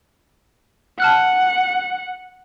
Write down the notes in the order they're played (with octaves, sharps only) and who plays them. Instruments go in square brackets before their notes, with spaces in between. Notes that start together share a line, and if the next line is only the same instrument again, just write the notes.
[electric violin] F#5 [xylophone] A5 F6 F#6